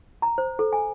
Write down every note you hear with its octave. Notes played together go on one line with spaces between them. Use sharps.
A#5
C5
A4
G#5